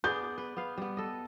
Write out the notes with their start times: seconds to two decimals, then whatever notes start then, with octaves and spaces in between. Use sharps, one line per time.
0.04 B3 G#4 D5 G6
0.38 B4
0.57 B3 B4 F5
0.77 G3 B3
0.97 A4 D#5